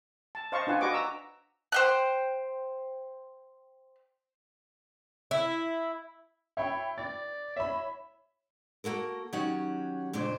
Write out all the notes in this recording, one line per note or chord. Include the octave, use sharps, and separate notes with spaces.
A5
C5 D#5 F5 A5 C#6
D4 F4 B4 F#5 G#5
F#4 B4 D#5 C#6 D6
A#5 E6
C5 G5 F#6
E4
C#5 E5 G5 B5
D5 A6
C#5 E5 B5
A#3 F#4 A4 A#4
D#3 F#3 C#4 F#4 G4 F#5
F2 A#2 C#3 D4 C5